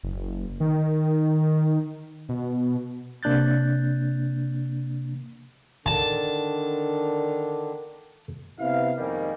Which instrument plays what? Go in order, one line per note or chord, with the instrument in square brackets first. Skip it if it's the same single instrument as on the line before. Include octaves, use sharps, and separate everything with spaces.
[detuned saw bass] F#1
D#3
B2
[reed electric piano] C3 A#3 D4 F#6 G6 A6
[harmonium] D3 D#3 D4 [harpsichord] A5
[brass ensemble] C3 B3 E4 F5
F2 G#2 D#3 G3 A#3